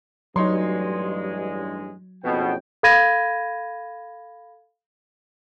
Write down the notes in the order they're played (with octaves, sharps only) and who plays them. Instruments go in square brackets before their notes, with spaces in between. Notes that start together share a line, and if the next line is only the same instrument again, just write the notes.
[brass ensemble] A1 G2 G#3 [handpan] F#3 [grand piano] D#4 C#5 C6
[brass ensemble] F#1 F2 G5 [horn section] B2
[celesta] A4 F5 B5 G#6 A#6 D#7